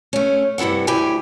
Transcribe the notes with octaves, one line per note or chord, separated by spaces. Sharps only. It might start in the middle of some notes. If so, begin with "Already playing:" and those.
A3 C#4
G2 C3 E4 A4 F#5
D2 E4 G4 G5 G#5